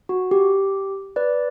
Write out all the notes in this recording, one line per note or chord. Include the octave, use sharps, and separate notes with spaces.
F#4
G4
B4 D5